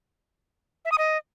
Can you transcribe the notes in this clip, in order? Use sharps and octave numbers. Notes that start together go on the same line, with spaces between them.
E5
D#6
D#5